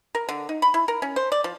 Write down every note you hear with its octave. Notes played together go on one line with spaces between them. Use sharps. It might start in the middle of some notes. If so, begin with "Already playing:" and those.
A#4
D3
D#4
B5
E4
A#4
C#4
C5
D5
F3